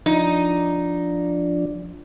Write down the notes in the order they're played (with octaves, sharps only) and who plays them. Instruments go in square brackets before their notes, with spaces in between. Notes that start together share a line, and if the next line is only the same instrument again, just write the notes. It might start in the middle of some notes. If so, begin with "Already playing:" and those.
[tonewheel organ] F3 D4 [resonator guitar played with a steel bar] D#4